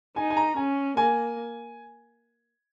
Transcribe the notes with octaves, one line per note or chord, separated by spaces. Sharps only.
D#4 G#5
G#5
A#5
C#4 G#5
A#3 G#5